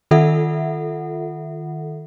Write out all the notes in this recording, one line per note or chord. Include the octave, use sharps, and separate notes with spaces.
D#3 F4 A4 E5 F#5